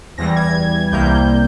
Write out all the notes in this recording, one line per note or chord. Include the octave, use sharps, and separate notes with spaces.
E2 E3 G3 A#6
G#6
C2 C3 G3 A#3 G6